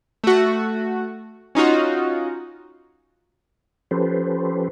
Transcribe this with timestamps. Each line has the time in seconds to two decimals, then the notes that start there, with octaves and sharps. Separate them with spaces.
0.24 A3 F#4
1.55 C#4 D#4 F4 F#4
3.91 F3 C#4 G4 A4 B4 C5